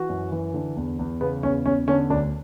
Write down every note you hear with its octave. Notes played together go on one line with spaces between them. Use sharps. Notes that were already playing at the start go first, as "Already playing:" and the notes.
Already playing: E3 F#4
F#2
E3
D3
E2
E2
C#3 B3
E2 C#4
E2 C#4
D3 C#4
D2 D4